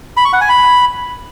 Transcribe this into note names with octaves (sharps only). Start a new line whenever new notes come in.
B5
C#6
F#5
G#5
B5